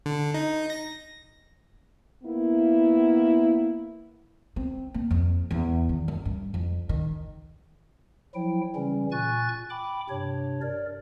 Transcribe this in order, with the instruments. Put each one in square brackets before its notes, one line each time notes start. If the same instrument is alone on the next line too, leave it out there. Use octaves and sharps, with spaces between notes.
[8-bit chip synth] D3
D#4
A#6
[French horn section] A#3 B3 E4
[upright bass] C4
A#3
F2
E2
D#3
F#2
G2
F2
D#3
[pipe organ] F3 F#3 E4 G5
C#3 E3 G3 C#4
A#2 G#5 C#6 F#6 A6
G5 B5 D6
G2 C3 D4 C#5
A#4 D5